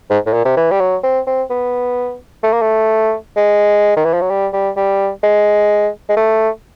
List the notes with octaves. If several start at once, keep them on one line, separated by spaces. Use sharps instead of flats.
G#2
A2
A#2
C3
E3
G3
F#3
C4
C4
B3
A3
A#3
A3
G#3
D#3
E3
F3
F#3
G3
G3
G3
G#3
G#3
A3